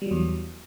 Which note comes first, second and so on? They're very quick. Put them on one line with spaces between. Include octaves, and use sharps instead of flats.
G3 F#3 E2 E3